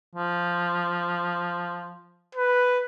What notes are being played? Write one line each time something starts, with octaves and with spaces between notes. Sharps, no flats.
F3
B4